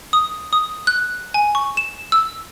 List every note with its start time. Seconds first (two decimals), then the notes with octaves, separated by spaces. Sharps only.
0.13 D#6
0.53 D#6
0.87 F#6
1.34 G#5
1.55 C#6
1.77 E7
2.12 E6